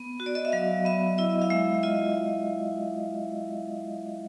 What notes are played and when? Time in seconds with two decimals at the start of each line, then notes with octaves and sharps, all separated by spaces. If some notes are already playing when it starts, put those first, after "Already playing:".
Already playing: B3
0.20 F#4
0.26 D5
0.35 D#5
0.45 E5
0.52 F#3 F5
0.85 B3 E5
1.18 E4 D#5
1.42 F5
1.50 G#3 E5
1.83 F4 D#5